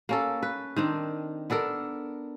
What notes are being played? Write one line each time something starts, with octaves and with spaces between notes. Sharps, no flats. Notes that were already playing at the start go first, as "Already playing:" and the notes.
A#3 C#4 A4
B4
D#3 C4 D4
B3 D4 A4 A#4